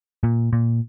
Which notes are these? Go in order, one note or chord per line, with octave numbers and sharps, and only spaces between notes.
A#2
A#2